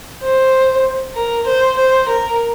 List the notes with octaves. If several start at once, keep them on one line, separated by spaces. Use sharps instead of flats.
C5
A#4
C5
C5
A#4